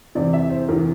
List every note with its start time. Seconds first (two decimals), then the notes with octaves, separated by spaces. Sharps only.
0.15 E2 C3 E3 D5
0.33 E5
0.50 C5
0.68 E2 C3 E3 A#4